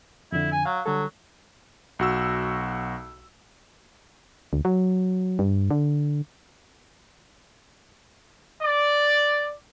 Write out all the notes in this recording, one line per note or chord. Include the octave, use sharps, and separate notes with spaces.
F2 D3 E4
G#5
F#3 F5
D3 F#3 G3 A4
B1 F#4 E6
D2
F#3
G2
D3
D5